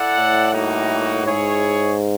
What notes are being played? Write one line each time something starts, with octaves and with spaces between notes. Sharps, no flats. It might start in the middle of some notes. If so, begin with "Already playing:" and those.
Already playing: E4 A4 D5 F#5
A2
G3 A#3 D#4 F#4
G#2 E4 G#4 C#5